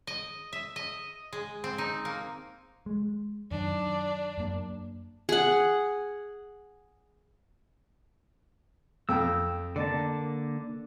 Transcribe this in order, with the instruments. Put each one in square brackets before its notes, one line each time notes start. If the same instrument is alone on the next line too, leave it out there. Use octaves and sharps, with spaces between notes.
[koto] D#5
E5
D#5
G#3
C4
D#4
A#3
[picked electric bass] G#3
[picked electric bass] F#2 D#3 [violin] D4
[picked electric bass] F#2 A#3
[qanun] G#4 F#5
[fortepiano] F2 G5 [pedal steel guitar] E6
[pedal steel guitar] D3 A#3 A5 [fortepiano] D5